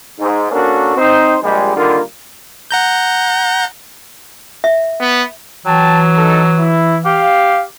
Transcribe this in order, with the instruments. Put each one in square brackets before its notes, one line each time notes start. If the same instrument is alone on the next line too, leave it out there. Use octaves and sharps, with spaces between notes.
[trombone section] G#2
A#3 C#4 D4 F#4 A4 A#4
C4 D#4 C5
A#1 G3 G#3
D3 D#3 G3 A#3 F4 A#4
[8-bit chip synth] F#5 A#5 G6
[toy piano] E5
[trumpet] B3
[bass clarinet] E3 [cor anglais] F#3 [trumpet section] G5 A5
[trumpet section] D#4 A4
E4
[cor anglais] G4 [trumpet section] F5